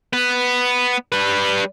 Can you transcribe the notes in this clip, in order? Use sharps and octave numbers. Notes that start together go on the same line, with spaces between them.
B3 B4
G3 B4